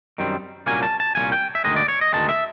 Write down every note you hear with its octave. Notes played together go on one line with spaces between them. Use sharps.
F#2 D#3 G3 C4
C2 A#2 F#3 A#3 C#4 G#5
A5
A5
C2 A#2 F#3 A#3 C#4 G#5
G5
E5
D2 C3 D#3 G#3 D#5
D5
C#5
D#5
D2 C3 D#3 G#3 A5
E5